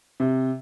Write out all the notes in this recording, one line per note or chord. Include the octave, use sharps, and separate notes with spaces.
C3